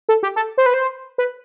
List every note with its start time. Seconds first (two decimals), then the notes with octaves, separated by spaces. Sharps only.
0.09 A4
0.23 G4
0.36 A4
0.58 C5
0.66 B4
0.74 C5
1.18 B4